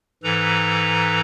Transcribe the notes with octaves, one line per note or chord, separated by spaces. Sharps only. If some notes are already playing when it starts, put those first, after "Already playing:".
G#2 E3 A4 B4 A#5